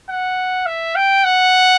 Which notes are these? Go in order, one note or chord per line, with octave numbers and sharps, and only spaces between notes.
F#5
E5
G5
F#5